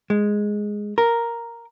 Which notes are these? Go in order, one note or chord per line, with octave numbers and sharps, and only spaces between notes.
G#3
A#4